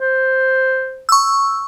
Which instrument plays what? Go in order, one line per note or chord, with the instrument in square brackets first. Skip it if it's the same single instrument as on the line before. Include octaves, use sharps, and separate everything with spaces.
[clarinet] C5
[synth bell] C#6 E6